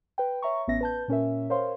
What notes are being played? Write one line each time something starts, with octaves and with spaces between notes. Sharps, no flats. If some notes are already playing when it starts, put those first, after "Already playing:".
B4 G5
C#5 E5 A#5 C#6
A1 B3 C#4 E5 A#6
B4 A5 G6
A#2 C#4 A#4 E5
A#4 C5 C#5 F5 C6